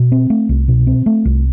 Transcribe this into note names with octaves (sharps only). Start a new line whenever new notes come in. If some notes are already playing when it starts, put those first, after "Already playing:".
Already playing: B2
C4
A3
C2
B2
C4
A3
C2